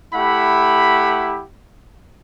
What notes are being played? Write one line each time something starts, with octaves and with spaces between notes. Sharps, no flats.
A3 E4 G4 F#5 B5